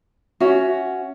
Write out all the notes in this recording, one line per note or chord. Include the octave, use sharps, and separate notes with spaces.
C#4 F#4 E5